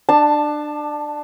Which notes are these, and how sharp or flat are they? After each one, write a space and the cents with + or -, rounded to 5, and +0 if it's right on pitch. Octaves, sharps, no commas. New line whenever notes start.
D4 +25 A5 +0